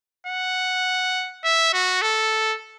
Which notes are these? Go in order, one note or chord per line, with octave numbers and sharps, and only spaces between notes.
F#5
E5
F#4
A4